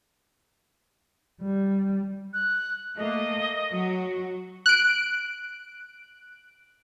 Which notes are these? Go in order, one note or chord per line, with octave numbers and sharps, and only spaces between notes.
G3
F#6
A3 A#3 D#5
F#3 F#4
F#6 D7